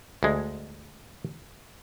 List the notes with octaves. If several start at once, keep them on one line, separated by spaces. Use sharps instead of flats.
D2 G#3